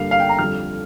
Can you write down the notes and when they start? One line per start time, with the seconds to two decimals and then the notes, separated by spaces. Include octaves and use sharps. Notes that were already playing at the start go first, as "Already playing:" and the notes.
Already playing: G2 D3 A#3 F5
0.11 F5
0.20 G5
0.29 A#5
0.39 F2 D3 G3 F6